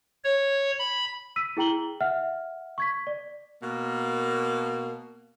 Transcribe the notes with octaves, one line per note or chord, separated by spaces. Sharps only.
C#5
B5
E6 B6 D#7
E4 G#4 G5 A#5 F#7 G7
E5 F#5 F6
C#6 G#6 B6
D5
B2 A#3